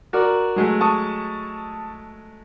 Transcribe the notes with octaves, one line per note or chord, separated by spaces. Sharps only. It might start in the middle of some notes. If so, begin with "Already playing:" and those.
F#4 A#4 D5
F#3 G#3 A3
A5 C#6 D#6